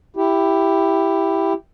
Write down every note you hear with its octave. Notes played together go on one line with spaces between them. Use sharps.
E4 G4